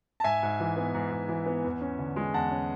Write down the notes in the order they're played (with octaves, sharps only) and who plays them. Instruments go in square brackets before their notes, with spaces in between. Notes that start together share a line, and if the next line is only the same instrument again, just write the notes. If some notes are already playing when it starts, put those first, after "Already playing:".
[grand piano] A5
G#2 E5 G#5
G#2
E3
B3
G#2
G#2
E3
B3
E2
C#4
D3
G#3
E2 F#5 A5
C#4